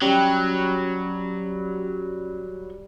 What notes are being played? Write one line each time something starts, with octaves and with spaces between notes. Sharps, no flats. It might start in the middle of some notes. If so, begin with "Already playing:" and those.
F#3 G3 C#4